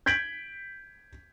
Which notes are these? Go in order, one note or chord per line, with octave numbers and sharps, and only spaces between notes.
G6 G#6 B6 D7 F#7